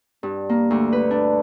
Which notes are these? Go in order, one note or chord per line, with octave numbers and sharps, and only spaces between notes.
G2
A#3
D2
B4
D4